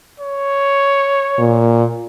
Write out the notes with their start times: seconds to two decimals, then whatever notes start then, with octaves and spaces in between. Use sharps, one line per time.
0.20 C#5
1.38 A#2